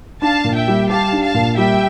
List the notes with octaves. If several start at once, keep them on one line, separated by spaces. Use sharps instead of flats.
D4 F5 A5
A#2
E5 G5
G3
G4 F5 A5
D4
F5 A5
A#2
G3 E5 G5